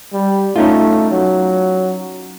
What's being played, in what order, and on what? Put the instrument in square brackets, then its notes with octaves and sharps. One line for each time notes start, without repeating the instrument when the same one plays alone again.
[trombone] G3
[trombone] A3 [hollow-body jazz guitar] C#4 D#4 F4
[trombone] F#3